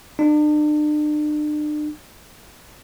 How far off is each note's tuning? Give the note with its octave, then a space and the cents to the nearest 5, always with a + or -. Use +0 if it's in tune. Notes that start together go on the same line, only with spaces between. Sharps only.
D4 +40